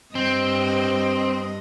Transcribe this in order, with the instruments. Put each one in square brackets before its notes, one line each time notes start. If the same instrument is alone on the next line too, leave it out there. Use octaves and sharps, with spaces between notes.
[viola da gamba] G2 D#5 [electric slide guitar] C4